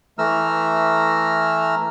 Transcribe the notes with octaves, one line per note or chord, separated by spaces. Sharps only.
E3 A3 A#5 E6 F6